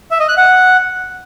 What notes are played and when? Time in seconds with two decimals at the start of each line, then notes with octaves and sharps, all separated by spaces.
0.11 E5
0.20 D#5
0.29 F#6
0.37 F#5